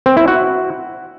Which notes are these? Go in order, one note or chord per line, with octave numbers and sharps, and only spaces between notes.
C4
E4
F#4